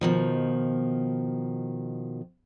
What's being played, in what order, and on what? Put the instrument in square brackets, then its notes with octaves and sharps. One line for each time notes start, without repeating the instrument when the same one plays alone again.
[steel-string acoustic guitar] B2 D#3 F3